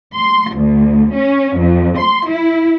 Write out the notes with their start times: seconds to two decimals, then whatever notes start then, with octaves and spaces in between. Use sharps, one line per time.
0.14 C6
0.55 D2
1.14 C#4
1.58 F2
1.98 C6
2.29 E4